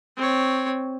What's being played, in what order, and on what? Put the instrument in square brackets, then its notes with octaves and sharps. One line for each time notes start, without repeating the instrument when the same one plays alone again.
[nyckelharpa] C4 C#5